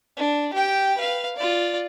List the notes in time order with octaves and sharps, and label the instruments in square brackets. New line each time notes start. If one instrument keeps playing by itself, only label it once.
[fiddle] D4
G4 G5
B4 F5
F4 D5